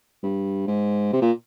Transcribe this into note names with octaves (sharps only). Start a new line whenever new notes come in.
G2
G#2
C3
A#2